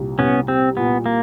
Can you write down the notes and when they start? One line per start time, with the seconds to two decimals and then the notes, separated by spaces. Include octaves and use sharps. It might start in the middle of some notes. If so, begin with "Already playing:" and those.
Already playing: C2 A#2 G3
0.19 C2 B3 C#4
0.48 G3 C4
0.77 A#2 B3
1.06 A#3